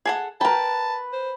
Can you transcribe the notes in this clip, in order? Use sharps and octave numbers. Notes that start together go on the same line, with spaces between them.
G#4 A4 F#5
A#4 B4 G5 A5 B5
C5